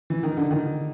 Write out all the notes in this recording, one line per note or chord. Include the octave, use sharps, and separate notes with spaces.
E3
D#3
D3
D#3